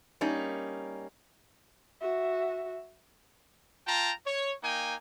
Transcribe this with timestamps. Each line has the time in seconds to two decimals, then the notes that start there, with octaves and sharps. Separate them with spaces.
0.21 G3 A#3 C#4 D#4
2.01 F#4 E5
3.87 F4 G5 A5 A#5
4.27 C#5
4.64 A#3 D#4 G5 G#5